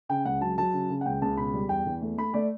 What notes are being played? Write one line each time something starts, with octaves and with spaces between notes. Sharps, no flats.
C#3 G5
C#2 F#5
F#3 A5
F#3 A5
C#3
C#3
F#5
C#2 G5
C#2 A5
B2 B5
G3
E2 G5
E2
A3
A3 B5
A3 D5